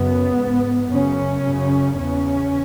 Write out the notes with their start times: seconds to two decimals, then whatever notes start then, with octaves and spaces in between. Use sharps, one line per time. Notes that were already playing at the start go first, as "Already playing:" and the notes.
Already playing: F#2 C#3 B3
0.36 G#2
0.90 F#2 C#3 C#4
1.44 F#2 C#3
1.97 E2 C#3 C#4